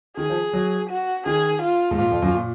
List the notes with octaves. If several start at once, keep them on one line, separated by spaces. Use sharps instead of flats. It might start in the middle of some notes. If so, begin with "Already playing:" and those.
D#3 G#4
F3
F#3
F#4
D#3 G#4
F4
G#2
A#2 F4
F2
F#2
A#2